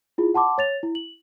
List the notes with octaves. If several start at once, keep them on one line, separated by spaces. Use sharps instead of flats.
E4 F4 G#4
F#5 A5 C6 D6
C#5 A6 F7
E4
F#7